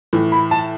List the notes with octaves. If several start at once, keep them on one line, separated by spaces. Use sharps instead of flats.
A2 E3
B5
A5